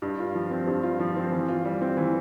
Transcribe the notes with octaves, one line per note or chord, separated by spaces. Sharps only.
G2
F4
F3
C4
G2
F4
F3
C4
E3
F4
G3
C4
E3